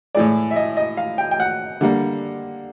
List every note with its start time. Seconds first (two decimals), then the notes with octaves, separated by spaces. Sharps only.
0.15 A2 E3 G#3 D5
0.51 E5
0.56 D#5
0.77 D#5
0.97 F5
1.18 G5
1.31 G5
1.40 F#5
1.81 D3 G3 A#3